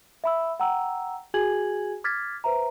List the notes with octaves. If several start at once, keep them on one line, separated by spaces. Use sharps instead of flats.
E5 B5 E6
F#5 G5 A#5 E6
F#4 G#4 G#5 G#6 F#7
D6 F6 G#6 A6 B6
B4 C5 E5 A#5